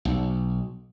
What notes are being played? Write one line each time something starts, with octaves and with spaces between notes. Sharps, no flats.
B1